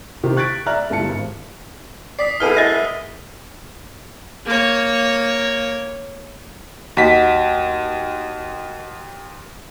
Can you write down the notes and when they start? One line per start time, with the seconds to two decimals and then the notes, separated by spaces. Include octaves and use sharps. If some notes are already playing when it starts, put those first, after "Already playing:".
0.24 C3 D#3 G4
0.37 C#6 F#6 G#6 A6 B6 D7
0.66 D5 E5 A#5 F6 F#6
0.90 G1 G2 E4 A5 C#7
1.09 G#1
2.19 D5 D#6 B6 C7
2.40 F#2 G#3 E4 A4 B4 F6 D#7 G7
2.57 D#5 E5
4.46 A#3 C#5
6.97 D#2 F#4 D#5 F#5 B6